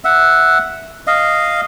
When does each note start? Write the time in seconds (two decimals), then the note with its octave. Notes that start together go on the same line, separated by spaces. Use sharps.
0.04 E5 F#5
1.07 D#5 F5